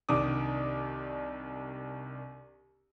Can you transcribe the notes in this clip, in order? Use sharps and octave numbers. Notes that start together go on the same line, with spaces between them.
C2 D#3 D4 D6 D#6